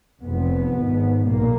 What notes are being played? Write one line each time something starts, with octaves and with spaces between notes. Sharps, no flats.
F1 F2 B3
G#1 G#2
B1 A#2 A#3